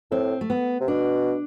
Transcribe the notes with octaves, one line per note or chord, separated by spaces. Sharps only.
A2 C4
A3
B3
C3
B2 D4